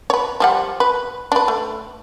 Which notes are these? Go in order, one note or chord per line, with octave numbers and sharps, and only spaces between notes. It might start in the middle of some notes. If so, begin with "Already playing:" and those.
B4 C#5
F3 G3 F#5
B4
D4 B4
A3